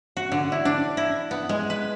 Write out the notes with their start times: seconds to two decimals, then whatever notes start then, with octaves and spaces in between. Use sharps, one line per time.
0.17 F#4
0.32 D3
0.52 E4
0.65 D4
0.97 E4
1.31 B3
1.49 G#3
1.70 B4